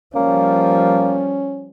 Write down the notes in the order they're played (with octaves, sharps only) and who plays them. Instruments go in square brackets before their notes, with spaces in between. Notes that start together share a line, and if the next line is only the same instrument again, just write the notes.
[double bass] F3 G3 [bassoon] A#3 [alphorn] C#4